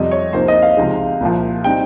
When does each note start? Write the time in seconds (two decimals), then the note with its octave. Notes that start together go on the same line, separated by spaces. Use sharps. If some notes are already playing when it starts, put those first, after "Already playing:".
Already playing: F2 C3 G3 D#5
0.11 C#5
0.33 C2 C3 F3 A#3 D#4 C5
0.48 D#5
0.62 F5
0.77 C#2 C3 F3 G#3 D#4
1.20 C2 A#2 F3
1.64 G3 C4 D#4 G5